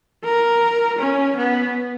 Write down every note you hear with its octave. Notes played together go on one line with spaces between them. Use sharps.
A#4
C#4
B3